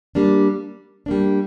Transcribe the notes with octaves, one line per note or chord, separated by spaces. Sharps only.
G3 A#3 D4
G3 A#3 D4